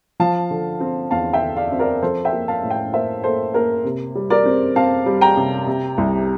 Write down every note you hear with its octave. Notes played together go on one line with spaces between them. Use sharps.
F3 F5 A5
D3
C4
E2 F5 A5
E5 G5
D3
D5 F5
C4
A#4 D5
F3 A4 C5
E5 G5
A#3
F5 A5
A2
E5 G5
A#3 C5 E5
A#3 A4 C5
A#3 A#4
C3
G3
A#4 D5
C4
C4 F5 A5
G3
G5 A#5
C3
C3
C2